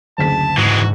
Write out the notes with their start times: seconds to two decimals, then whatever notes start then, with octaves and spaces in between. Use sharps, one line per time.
0.18 F#1 D2 A5 B6
0.57 G#2 E3 G#3 F#4